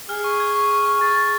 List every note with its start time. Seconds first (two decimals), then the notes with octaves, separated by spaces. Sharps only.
0.09 G#4 F6
0.24 C#6
0.40 G#6
0.55 C#6
0.71 C#6
0.85 C#6
1.01 G#4 A6
1.16 A6